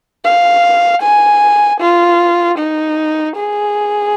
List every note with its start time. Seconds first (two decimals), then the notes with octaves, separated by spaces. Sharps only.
0.25 F5
1.03 G#5
1.81 F4
2.59 D#4
3.37 G#4